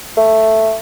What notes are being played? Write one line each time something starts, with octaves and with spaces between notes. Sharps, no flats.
A3